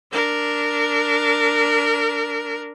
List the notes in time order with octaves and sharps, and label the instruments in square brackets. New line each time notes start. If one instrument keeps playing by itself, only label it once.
[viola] D4 A#4